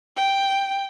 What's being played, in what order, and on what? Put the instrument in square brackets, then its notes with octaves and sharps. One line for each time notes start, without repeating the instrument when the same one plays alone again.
[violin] G5